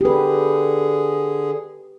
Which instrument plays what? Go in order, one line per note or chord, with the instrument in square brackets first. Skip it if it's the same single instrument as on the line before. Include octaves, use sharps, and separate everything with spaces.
[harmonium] D3 G#4 [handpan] G4 B4